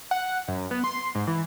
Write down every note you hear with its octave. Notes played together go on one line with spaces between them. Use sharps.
F#5
F#2
B3
C6
G#2
E3